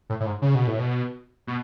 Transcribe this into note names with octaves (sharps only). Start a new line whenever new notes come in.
A2
A2
G#2
C#3
B2
A2
B2
B2